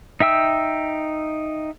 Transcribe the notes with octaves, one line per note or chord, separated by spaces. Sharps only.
D#4 E5 G5 E6